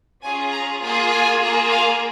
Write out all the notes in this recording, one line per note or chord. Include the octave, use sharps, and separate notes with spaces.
C#4 F4 G#4 G#5
A#5
A#3 F4 G#4
G#5
A#3 F4 G#4
F5